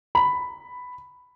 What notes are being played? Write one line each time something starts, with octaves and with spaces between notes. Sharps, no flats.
B5